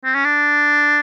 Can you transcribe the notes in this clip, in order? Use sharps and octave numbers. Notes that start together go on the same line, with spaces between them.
C4
C#4
D4